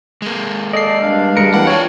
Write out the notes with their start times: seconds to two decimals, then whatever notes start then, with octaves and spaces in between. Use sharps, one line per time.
0.22 G#3 A#3
0.73 A4 D5 D#5 C7
1.01 G2 D4 F5
1.37 G3 G#3 A#4 C#7
1.54 E3 A#3 F#5 G5 B5
1.67 F4 C#5 F#5